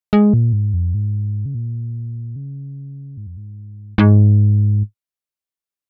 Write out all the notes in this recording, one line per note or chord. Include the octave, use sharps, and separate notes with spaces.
G#3
A#2
G#2
F2
G#2
C#3
A#2
C#3
G#2
F2
G#2
G#2